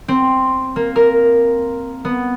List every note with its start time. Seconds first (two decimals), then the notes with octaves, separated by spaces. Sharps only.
0.08 C4
0.76 A#3
0.96 A#4
2.05 B3